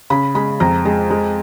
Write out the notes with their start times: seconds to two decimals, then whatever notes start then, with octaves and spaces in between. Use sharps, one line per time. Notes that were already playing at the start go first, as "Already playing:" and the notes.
0.10 C#3 B5
0.35 G#3 B5
0.60 F2 A#5
0.85 G#3
1.10 G#3